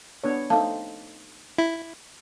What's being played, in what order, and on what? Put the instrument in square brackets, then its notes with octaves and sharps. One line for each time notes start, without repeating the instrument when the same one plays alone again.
[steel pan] B3 D4 C#5
[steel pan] A3 C4 D#4 [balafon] F5 A5
[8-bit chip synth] E4